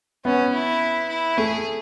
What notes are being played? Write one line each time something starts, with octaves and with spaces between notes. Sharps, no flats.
B3 C#4
E4
E4
A3 G#4